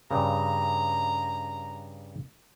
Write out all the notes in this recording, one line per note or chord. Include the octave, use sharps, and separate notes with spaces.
G2 C#3 A#5